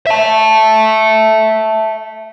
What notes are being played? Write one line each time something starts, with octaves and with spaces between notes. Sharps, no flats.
E5 A5